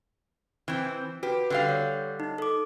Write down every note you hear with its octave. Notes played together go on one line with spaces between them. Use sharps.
E3 C4
F#4 G4 B4
D3 G3 F5
C#5
D#4
A4 D6